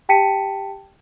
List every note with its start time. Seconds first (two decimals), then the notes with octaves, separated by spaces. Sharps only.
0.09 G4 G5 A5 B6 C#7 D#7